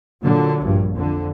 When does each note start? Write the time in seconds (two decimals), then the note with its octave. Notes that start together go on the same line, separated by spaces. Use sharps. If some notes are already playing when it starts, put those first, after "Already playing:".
0.22 A#2 D3 F#3
0.62 A#1 G2
0.95 F2 D3